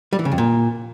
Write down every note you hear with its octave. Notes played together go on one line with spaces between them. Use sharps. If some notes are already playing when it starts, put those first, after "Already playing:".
G3
E3
C#3
F2
A#2